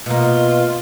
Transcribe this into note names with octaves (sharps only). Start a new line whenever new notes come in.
B2 A#3 F4